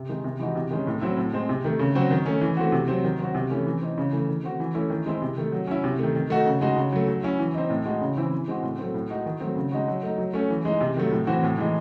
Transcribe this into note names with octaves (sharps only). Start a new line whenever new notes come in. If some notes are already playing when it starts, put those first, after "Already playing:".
Already playing: C3
D#3 G#3
C3
E3 G#3 D#4 F#4
C3
D#3 G#3 C#4
A2
F#3 C4 E4
A2
G#3 C4
C3
D#3 A3
C#3
F#3 C4 F#4
D#3
A3 C#4
E3
A3 C4 F#4
C3
F#3 C4
D#3
F#3 C4 F#4
C3
E3 A3 C#4
E3
C4 D#4
C#3
E3 A3
D#3
A3 C4 F#4
E3
A3 C#4 E4
D#3
G#3 C4 E4
C3
D#3 A3
F#3
C#4 E4
C3
D#3 A3
D#3
A3 D#4 F#4
C#3
G#3 D#4 F#4
C#3
F#3 A3
F#3
C#4 E4
E3
C4 D#4
A2
G#3 D#4 F#4
C#3
E3 C4 E4
E3
G#3 C4 F#4
A2
F#3 A3 C4
A2
G#3 D#4 F#4
D#3
F#3 A3 C4
C#3
G#3 D#4 F#4
F#3
A3 D#4
F#3
A3 C#4
E3
G#3 D#4
C3
D#3 F#3 A3
A2
E3 C4 F#4
A2
E3 G#3 D#4